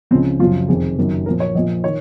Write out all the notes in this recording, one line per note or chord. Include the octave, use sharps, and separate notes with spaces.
C#2 C#3 F3 C4
F#1 F#2 F3 F4
F1 F2 D#3 G#4
F#1 F#2 D#3
A#1 A#2 F3 A#4
C#5
A#1 A#2 F3 D#5
D#3 C#5